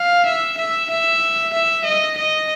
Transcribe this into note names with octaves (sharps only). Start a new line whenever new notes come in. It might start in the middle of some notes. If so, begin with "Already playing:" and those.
Already playing: F5
E5
E5
E5
E5
D#5
D#5